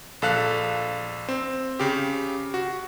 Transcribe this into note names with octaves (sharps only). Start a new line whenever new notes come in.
A#1 A4 F5 F#6
C4
C#3 G4
F#4